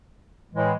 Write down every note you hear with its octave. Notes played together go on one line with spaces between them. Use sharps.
A2 E3 G#3